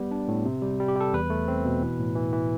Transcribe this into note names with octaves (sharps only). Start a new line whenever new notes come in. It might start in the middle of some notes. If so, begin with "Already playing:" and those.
Already playing: G3 B3
D4
A2
C3
G3
G3
G4
G3 A4
E2 B4
A3
C4
B2
E3
A2
E3
E3